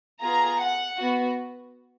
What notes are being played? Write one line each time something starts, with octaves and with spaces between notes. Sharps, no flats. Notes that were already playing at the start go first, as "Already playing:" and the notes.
B3 F4 G#4 A#5
F#5
B3 F#4